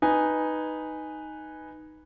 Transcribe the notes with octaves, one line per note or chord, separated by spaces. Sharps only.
D#4 B4 G#5